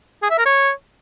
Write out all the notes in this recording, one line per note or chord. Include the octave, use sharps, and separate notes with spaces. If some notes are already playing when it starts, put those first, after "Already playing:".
G#4
E5
A#4
C#5